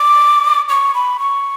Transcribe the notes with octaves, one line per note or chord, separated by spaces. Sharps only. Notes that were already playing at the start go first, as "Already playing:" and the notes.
Already playing: D6
C#6
B5
C#6